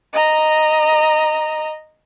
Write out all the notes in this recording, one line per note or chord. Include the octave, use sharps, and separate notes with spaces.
D#5 A#5